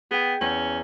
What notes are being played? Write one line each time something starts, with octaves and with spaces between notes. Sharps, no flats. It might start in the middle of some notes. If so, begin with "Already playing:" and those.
B3 G#4 G5
E2 C#4